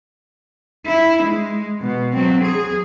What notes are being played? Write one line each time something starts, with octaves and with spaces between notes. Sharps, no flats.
E4
G#3
B2
F#3 C4
G#4